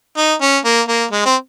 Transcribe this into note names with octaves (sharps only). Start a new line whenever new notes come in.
D#4
C#4
A#3
A#3
G#3
C4